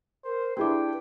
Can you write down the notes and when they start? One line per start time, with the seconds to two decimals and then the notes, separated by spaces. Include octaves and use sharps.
0.25 A#4 C5
0.57 D4 E4 G4 G#4 B4 G5 D6